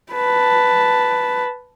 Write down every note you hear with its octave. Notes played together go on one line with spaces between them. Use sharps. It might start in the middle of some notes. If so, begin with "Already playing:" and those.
B4 A5